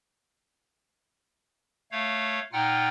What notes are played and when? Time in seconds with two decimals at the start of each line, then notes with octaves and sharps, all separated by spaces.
1.91 A3 C#5 F5
2.53 A#2 D#4 F4 F#5 G5 F6